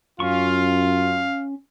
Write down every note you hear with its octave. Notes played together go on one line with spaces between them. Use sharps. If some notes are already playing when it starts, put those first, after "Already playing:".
F#2 C#4 F4 F5 C#6